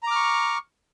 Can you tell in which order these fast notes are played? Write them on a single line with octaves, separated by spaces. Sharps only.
A#5 D6 F6 C#6